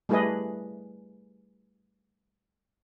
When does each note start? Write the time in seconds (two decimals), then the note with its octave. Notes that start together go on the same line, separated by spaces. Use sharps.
0.09 G3 A3 E4 G#4 B4 D#5